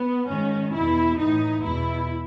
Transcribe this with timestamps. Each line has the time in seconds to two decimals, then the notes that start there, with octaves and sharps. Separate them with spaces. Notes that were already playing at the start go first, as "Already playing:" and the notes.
Already playing: B3
0.28 G#2 D#3 C#4
0.73 E2 B2 E4
1.19 A2 E3 D#4
1.64 E2 B2 E4